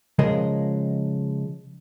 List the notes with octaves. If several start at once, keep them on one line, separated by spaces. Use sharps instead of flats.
C#3 F3 G#3 A#4 D#5